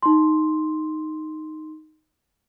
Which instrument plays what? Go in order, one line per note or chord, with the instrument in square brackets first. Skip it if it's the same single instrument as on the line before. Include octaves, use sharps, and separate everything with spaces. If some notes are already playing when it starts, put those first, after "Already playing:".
[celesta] D#4 C6